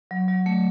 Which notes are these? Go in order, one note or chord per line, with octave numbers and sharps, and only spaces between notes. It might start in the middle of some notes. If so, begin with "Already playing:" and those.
F#3
F#3
A3